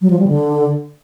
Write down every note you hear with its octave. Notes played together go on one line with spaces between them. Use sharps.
F#3
F3
G3
D3